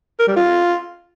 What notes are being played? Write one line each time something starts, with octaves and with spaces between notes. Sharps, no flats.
A#4
G3
F4